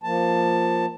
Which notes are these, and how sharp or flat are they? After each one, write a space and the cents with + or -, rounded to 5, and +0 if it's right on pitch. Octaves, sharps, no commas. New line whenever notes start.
F3 +0 A#3 +0 A5 +10